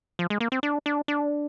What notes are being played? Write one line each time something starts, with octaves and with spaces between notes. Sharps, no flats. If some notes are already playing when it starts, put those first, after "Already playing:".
F3
G#3
A#3
C4
D4
D4
D4